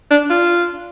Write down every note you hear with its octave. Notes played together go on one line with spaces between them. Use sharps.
D4
F4